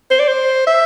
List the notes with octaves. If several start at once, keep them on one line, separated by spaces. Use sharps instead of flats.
C5
D5
C5
E5